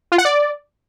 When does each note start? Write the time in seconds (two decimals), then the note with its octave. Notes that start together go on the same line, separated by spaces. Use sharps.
0.12 F4
0.18 F#5
0.25 D5